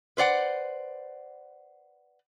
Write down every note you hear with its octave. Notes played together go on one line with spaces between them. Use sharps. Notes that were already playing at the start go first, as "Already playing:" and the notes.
B4 C5 D5 F#5